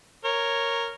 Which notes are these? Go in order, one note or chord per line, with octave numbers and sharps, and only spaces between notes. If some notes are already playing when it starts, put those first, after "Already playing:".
A#4 C#5